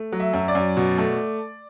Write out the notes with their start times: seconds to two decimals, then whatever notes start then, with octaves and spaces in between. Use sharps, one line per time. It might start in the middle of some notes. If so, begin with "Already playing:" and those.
Already playing: A3
0.12 F#3
0.20 E5
0.33 F#2
0.48 D5
0.55 F#2
0.77 B2
0.98 A3